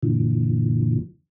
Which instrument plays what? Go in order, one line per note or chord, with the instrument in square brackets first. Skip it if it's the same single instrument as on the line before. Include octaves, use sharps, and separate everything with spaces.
[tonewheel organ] F#2 A#2 D3 E3 F3